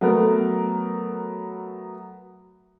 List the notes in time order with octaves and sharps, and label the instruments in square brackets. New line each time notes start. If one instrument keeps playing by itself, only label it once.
[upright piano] F#3 A3 B3 A#4